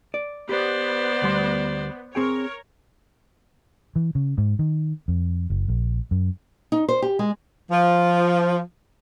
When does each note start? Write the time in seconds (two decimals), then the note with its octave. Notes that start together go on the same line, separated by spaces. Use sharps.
0.14 D5
0.49 B3 G4 C5 D5
1.22 D2 G3 C6
2.15 C4 G#4 A#4 C#5 G5
3.96 E3
4.15 C#3
4.38 G#2
4.59 D#3
5.08 F2
5.50 F#1
5.68 A#1
6.11 F#2
6.72 D#4
6.89 C5
7.02 G4
7.19 G#3
7.71 F3